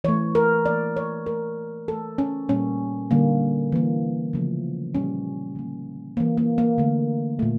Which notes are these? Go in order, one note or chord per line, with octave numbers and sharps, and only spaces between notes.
E3 A3 C#5
A#4
E3 A#3 D5
C#5
E3 A3 A#4
E3 A3 A4
C#4
A#2 G3 A#3 C#4
D3 G3 A#3
E3 A#3
C#3 F3 A3
A#2 G3 A#3 C#4
D3 G3 A#3
E3 A#3
A#3
A#3
D3 A3
A#2 A3